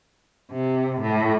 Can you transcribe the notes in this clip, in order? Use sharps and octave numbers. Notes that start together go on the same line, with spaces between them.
C3
A2